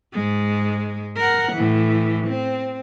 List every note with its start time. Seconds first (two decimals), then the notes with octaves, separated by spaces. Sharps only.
0.14 G#2 G#3
1.17 A#4 F#5
1.53 A2 E3
2.28 C4